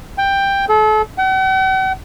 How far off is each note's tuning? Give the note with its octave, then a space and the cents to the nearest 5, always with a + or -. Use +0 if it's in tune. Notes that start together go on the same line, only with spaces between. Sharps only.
G5 +10
A4 -35
F#5 +45